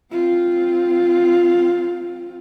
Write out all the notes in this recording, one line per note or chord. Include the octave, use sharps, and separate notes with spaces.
C4 F4